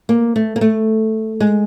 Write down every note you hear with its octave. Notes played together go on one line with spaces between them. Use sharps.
A#3
A3
A#3
A3
G#3